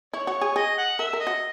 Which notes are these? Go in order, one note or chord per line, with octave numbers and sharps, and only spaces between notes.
E4 C#5
F#4
G#4
G#4 D#5
F#5
A#4 E5
A#4
D#5
F#4